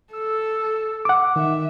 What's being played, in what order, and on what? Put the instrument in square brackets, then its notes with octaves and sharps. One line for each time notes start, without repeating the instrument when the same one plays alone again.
[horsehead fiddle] A4 [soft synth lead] E6
[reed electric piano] F#5 D6
[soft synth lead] D#3 [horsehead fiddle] E5